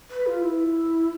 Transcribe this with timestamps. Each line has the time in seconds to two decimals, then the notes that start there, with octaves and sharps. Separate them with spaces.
0.10 B4
0.27 F4
0.42 E4